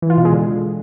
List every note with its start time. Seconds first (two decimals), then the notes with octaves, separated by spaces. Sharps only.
0.02 E3
0.10 F4
0.17 B2
0.25 G#3
0.33 D3